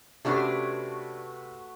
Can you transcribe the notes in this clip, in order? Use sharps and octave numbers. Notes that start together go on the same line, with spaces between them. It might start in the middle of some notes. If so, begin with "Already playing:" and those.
C3 A3 C#4 D4 F#4 G#4 B4